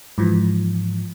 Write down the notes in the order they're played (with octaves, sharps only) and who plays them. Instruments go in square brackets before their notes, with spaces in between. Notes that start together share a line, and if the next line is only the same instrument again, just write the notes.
[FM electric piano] G#2 E3 F3